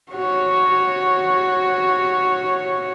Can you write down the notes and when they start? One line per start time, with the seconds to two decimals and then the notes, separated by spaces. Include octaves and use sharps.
0.12 F#4 C#5